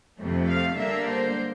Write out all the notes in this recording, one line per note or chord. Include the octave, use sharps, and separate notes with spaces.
F2 C3 F3 A3
F5
D3 G3 A#3 D4 E5
C5